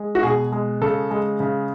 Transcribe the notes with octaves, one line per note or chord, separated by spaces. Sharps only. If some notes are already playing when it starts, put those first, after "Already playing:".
Already playing: G#3
F#4
B2 G#4
G#3
C#3 A4
G#3
C#3